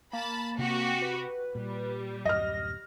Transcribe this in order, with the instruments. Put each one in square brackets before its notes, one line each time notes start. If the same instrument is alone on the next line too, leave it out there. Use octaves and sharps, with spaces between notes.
[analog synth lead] A#3 [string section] A5 B5
[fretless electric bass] C3 C4 [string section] F#4 G4
[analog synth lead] B4
[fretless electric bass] A#2 [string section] G3
[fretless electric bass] D1 F#2 [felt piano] D#5 F6 [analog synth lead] A#6